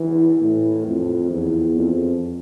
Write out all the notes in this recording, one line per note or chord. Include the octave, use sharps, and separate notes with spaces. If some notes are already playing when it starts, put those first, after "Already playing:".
Already playing: E3
A2
F2
E2
F2